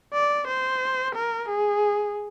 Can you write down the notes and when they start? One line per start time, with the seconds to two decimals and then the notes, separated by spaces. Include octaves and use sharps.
0.14 D5
0.47 C5
1.15 A#4
1.49 G#4